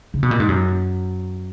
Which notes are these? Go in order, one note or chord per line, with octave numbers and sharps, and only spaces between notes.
C#3
B2
A#2
G#2
F#2